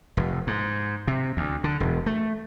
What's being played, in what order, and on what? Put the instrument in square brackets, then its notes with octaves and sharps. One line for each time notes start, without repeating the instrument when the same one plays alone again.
[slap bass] F1
G#2
C3
D2
D3
E1
A3